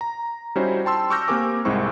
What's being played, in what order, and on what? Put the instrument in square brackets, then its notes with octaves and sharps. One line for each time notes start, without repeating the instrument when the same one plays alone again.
[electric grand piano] A#5
G3 C#4 D#4 E4 F#4 C5
G5 A5 C6 E6
C#6 D6 E6 F6 G6 A#6
A#3 C4 G4 A#4 G#5 D6
C2 G#2 G#3 C4 E4 C#6